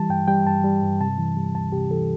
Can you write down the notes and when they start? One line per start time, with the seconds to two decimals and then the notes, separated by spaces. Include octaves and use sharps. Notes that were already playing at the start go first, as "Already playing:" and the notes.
Already playing: E3 G3 A5
0.09 G2 G5
0.28 G3 G5
0.46 G2 A5
0.64 G3
0.83 G2
1.00 C3 A5
1.18 E3
1.36 G3
1.54 D2 A5
1.72 C3 G4
1.90 E3 A4